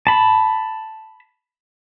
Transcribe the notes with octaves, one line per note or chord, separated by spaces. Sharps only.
A5 B5